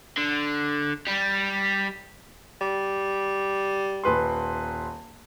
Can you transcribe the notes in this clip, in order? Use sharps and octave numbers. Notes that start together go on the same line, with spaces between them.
D3
G3
G3
D#1 B4 C6